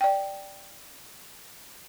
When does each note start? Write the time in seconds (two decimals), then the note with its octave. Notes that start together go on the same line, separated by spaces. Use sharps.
0.01 D5 G5